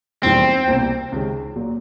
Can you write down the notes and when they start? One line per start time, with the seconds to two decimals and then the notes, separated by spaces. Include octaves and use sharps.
0.23 E1 D#2 D#3 G3 C4
0.68 C2 B2 G3 A#3
1.12 C#2 C3 D#3 G#3 C#4
1.56 A#2 F#3 A#3